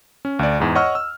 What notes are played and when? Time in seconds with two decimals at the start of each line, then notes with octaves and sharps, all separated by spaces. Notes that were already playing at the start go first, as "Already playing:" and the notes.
0.25 C#4
0.39 D2 D5
0.60 E2 G#2
0.75 C#5 D#5 F#5 C#6 E6 F6
0.95 E6